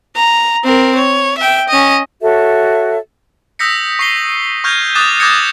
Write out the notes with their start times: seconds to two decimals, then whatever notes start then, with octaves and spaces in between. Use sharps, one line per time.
0.16 A#5
0.65 C4 A#4
0.95 C#5
1.38 E5 G5
1.68 C#4 D#5
2.22 F#4 A4 C#5 E5
3.59 D#6 E6 G6 A#6 B6 C#7
3.99 C#6 C7 G7
4.64 C#6 F6 G6 G#6 A#6 F7
4.95 D6 D#6 F#6 A6 E7
5.20 D6 E6 G6 G#6 A#6 C#7